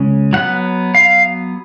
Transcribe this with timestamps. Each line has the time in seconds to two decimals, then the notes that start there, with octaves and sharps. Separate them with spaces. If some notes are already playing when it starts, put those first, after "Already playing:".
Already playing: C#3 G#3 C#4
0.33 F#3 B3 F#5
0.95 F5